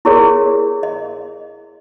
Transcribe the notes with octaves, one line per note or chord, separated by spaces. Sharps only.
E4 G4 G#4 A#4 C#5 D5
D#5